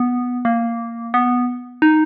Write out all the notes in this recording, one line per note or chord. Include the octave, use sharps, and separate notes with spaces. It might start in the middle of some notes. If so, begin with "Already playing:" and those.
Already playing: B3
A#3
B3
D#4